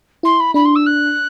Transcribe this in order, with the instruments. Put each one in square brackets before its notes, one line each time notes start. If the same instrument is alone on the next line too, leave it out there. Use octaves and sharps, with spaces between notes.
[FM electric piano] E4 [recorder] C6
[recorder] B5
[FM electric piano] D4 [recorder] B5
[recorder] C6
E6
F#6